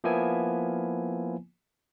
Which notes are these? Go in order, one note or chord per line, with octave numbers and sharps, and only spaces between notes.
F3 A#3 B3 E4 G#5